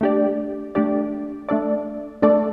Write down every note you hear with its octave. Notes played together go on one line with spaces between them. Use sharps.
A3 D4 G4 D5
A3 D4 G4 D5
A3 D4 A4 D5
A3 D4 A4 D5